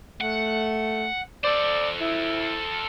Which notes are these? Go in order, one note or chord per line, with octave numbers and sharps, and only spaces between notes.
A3 F#5
A4 C5 D5
E4